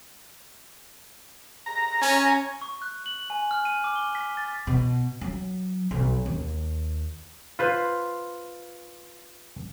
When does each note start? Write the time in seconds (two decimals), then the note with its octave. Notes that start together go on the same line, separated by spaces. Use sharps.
1.66 A#5
2.02 C#4 G#5 A#5
2.62 C#6
2.82 F#6
3.06 F#7
3.30 G#5
3.51 F6
3.65 D#7
3.84 D6
3.96 G7
4.15 B6
4.37 A6
4.67 B2
5.21 F#3
5.91 B1
6.26 D#2
7.59 F4 B4 C5